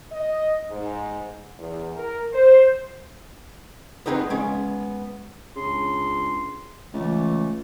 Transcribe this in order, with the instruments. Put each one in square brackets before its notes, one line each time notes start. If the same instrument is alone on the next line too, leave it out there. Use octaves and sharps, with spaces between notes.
[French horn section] D#5
G#2
E2
A#4
C5
[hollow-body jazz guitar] B3 C4 D#4 G#4 B4
G#3 B3 C#4
[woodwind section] C#2 D4 C6 [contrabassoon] C#3
[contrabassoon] C#2 [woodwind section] E3 A3